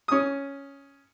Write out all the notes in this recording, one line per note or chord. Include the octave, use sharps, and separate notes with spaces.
C#4 D#6